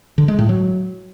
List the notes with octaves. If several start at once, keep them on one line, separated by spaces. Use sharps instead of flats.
D3
G#3
A2
F#3